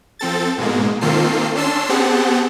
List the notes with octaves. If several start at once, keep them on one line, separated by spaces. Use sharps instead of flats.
F3 C4 A4 A6
G#2 B2 G#3 A#3
D#3 A#3 C4 F4 A4 C7
C#4 D4 A5 C6 E6 C7
B3 C4 G4 G#4 F#5 A5